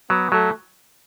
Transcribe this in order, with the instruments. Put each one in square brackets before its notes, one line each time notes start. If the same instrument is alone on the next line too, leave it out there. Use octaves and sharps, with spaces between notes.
[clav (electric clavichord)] F#3 [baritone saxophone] B3
[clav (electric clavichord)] F#3 [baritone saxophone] A3